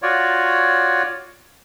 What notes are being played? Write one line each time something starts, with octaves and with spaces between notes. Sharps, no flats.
F4 F#4 C#5 D5